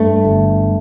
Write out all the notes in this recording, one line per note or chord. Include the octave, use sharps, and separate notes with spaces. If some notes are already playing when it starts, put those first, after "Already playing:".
Already playing: G2 A3
G1